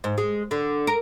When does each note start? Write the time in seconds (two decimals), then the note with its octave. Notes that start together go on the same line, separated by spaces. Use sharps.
0.04 G#2
0.18 G#3
0.51 D3
0.87 A#4